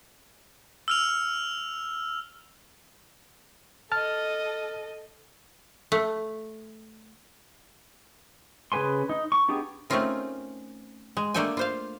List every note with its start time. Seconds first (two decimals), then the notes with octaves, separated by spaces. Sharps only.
0.88 E6 F6 F7
3.92 A4 D#5 A5 F6
5.92 A3
8.72 C#3 G#4 B4 G#5 C6
9.09 D#4
9.32 C#6
9.48 B3 D4 D#4 G4 G#4
9.90 A3 C4 C#4 D#4 F4 A#4
11.17 G#3
11.34 A3 A#3 D4 A4 G5 G#5
11.57 F4 C5 F5